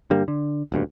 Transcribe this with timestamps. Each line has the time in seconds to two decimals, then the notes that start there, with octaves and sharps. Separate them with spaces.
0.10 G2 D3 G3 A#3
0.28 D3
0.72 D#1 D2 G2